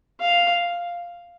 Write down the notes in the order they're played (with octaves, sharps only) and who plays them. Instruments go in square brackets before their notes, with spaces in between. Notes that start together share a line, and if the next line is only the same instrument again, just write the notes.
[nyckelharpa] F5